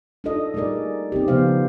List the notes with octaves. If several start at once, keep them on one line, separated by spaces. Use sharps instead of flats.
D4 D#4 F4 A4 D#5
G3 A3 D#4 G#4 A#4 D5
C4 D#4 G4
C#3 F3 B3 C5 F5